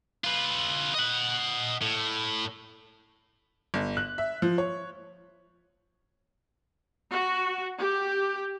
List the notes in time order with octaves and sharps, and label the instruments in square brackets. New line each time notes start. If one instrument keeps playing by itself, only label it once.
[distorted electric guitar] F4 B4
D#5 F#5
A2
[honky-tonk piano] G1
F#6
E5
F3
C#5
[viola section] F#4
G4